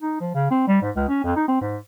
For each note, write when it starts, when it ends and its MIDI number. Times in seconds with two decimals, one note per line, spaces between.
0.01 0.16 63
0.20 0.31 53
0.35 0.49 49
0.51 0.67 60
0.68 0.81 55
0.82 0.91 44
0.96 1.04 37
1.08 1.22 61
1.24 1.35 41
1.36 1.45 63
1.48 1.61 60
1.61 1.77 44